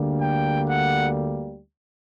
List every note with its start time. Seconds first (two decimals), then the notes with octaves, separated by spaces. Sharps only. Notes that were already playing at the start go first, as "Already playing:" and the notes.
Already playing: D2 D3 G3 A#3
0.22 G5
0.68 F#5